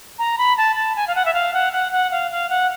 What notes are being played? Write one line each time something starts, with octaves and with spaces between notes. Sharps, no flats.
A#5
B5
A5
A5
G#5
F5
F#5
E5
F5
F#5
F#5
F#5
F5
F5
F#5